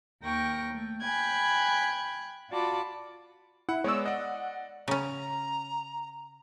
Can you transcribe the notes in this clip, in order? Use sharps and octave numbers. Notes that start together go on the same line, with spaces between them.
D#2 A#4 G5 C#6 A#6
A3
G5 G#5 B5 F#6 G#6
F4 F#4 D5 A5 B5 D6
E4 F#5
G#3 B3 C#5 D5 E6
D5 D#5 F#5
C#3 C#4 A#5